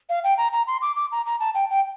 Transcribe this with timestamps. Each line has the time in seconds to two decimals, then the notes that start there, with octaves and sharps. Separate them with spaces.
0.09 F5
0.24 G5
0.38 A#5
0.53 A#5
0.67 C6
0.82 D6
0.96 D6
1.12 A#5
1.26 A#5
1.40 A5
1.55 G5
1.70 G5